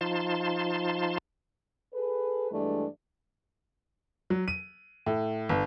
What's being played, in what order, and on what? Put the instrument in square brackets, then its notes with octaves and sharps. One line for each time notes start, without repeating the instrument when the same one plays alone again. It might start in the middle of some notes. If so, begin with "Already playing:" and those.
[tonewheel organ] F3 D#4 F4 A5 C6
[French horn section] G#4 A4 B4
G2 E3 G#3 A3 D4
[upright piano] F#3
D#7
A2
G1